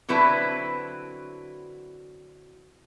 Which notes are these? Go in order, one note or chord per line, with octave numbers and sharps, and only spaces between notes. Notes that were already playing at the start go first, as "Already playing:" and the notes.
D3 F#3 C4 E4 B4